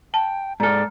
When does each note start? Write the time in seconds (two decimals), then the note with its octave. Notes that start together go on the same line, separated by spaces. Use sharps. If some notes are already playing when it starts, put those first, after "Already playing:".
0.14 G5 A5
0.60 G#2 A4 D5 A#5 F6